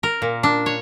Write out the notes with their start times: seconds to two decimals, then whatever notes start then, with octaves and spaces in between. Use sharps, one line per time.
0.03 A#4
0.22 A#2
0.43 D4
0.66 C#5